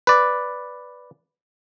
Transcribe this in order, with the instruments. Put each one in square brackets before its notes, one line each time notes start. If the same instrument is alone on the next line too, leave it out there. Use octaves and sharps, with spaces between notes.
[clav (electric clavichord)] B4 D5